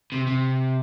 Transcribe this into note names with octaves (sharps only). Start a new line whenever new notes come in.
C3
C3